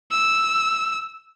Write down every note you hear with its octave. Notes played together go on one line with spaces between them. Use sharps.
E6